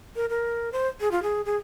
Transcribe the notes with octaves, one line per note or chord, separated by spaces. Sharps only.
A#4
A#4
C5
G#4
F4
G#4
G#4